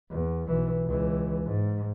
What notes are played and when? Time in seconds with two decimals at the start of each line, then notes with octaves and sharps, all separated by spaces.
0.10 E2
0.48 B1 E3
0.85 C#2 E3
1.44 G#2